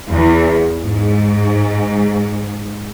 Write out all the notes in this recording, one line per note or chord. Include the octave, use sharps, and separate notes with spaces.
E2
G#2